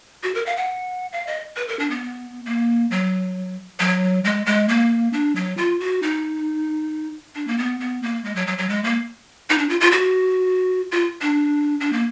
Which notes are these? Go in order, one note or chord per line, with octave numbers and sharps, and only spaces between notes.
F#4
A#4
F5
F#5
F5
D#5
B4
A#4
D4
B3
A#3
F#3
F#3
G#3
G#3
A#3
D4
F#3
F4
F#4
D#4
D4
A#3
B3
B3
A#3
G#3
F#3
F#3
F#3
G#3
A#3
D#4
D4
F4
F4
F#4
F4
D4
D4
A#3